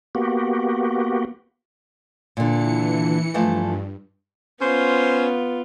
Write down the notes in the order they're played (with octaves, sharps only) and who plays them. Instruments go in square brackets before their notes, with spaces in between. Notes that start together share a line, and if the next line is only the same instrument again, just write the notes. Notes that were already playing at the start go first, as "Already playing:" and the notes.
[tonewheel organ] A#3 B3 F#4 G4
[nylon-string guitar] A#2 D3 [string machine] E3 C#7
[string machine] G2 [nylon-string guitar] E3 F3 A3
[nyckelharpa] B3 F4 [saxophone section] C#4 C5